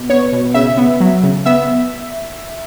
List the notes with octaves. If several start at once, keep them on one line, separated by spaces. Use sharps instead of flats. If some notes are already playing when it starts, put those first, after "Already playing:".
Already playing: B2
B3 C#5
B2
C#3 E5
B3
F#3
C#3
B3 E5